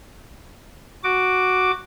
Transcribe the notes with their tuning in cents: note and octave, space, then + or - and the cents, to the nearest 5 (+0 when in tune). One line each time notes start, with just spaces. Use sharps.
F#4 +0 D6 +0